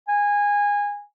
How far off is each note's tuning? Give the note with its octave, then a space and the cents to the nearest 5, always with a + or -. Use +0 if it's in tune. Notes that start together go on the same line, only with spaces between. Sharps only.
G#5 -20